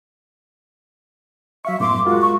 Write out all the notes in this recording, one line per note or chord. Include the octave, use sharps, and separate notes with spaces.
F#3 E5 F5 C#6
F#2 A2 B3 C6 D6
G#3 F4 F#4 A#4
C#6